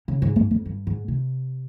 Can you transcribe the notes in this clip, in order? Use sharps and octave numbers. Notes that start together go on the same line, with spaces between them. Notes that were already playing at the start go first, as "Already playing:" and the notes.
C#3
G#2
G2
F2
G2
G#2
C3